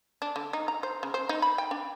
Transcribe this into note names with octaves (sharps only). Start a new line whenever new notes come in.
D4
D3
D#4
A#5
C5
C#3
C5
D#4
B5
G5
D4